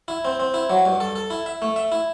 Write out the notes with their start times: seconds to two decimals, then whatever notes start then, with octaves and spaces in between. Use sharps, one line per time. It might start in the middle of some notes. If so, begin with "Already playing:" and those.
0.08 E4
0.25 C4
0.40 C4
0.54 E4
0.70 F#3
0.85 G2
1.00 A4
1.16 A4
1.30 E4
1.46 E5
1.62 A3
1.76 E5
1.92 E4